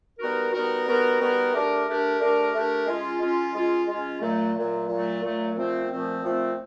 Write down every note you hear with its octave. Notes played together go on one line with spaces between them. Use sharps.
G3 B3 D#4 F#4 A#4
G3 B3 D#4 F#4 A#4
G3 B3 D#4 F#4 A#4
G3 B3 D#4 F#4 A#4
A3 D4 G4 A#4
A3 D4 G4 A#4
A3 D4 G4 A#4
A3 D4 G4 A#4
G#3 C#4 F4
G#3 C#4 F4
G#3 C#4 F4
G#3 C#4 F4
A#2 F#3 A3
A#2 F#3 A3
A#2 F#3 A3
A#2 F#3 A3
A#2 F3 A3 C4
A#2 F3 A3 C4
A#2 F3 A3 C4